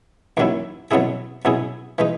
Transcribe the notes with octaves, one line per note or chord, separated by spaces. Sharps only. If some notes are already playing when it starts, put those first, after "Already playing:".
D#2 D#3 F#3 C#4 E4
B2 F#3 C#4 E4 G#4
B2 F#3 C#4 E4 G#4
E3 G#3 D#4